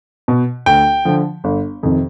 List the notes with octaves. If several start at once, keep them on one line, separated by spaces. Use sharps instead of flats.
B2
D2 G5
D3 F3
G1
F2 C3 D#3